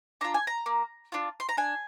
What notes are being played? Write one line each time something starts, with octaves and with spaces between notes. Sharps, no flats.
D4 F4 A#5
G#5
A#5
A#3
D4 F4
C6
A#5
D4 G#5